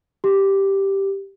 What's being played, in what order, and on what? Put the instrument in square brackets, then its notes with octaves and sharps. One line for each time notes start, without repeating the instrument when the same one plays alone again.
[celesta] G4